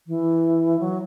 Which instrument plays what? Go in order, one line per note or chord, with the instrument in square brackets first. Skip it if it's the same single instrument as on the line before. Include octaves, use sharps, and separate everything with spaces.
[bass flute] E3
F#3